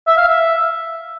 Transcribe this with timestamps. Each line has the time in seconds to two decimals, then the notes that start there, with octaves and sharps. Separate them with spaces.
0.07 E5
0.17 F5
0.28 E5